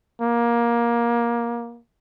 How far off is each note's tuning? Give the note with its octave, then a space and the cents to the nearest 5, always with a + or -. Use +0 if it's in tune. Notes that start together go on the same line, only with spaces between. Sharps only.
A#3 +20